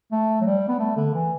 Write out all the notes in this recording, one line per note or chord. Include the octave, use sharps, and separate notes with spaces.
A3
F#3
G3
B3
A3
D3
E3